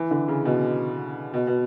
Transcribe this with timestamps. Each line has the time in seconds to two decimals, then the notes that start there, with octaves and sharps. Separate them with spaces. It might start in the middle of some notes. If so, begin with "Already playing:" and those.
Already playing: E3
0.11 D3
0.28 C#3
0.45 B2
1.34 B2
1.47 B2